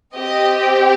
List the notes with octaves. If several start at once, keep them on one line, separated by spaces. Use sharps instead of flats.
C4 G4 D#5